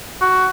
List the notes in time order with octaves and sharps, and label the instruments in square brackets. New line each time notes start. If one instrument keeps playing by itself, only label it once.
[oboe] F#4